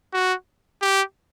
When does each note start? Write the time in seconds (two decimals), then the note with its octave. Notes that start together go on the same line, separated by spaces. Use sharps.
0.13 F#4
0.82 G4